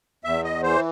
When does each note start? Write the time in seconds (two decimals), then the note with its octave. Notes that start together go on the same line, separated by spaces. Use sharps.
0.24 E2 E5
0.44 D#5
0.63 E3 C5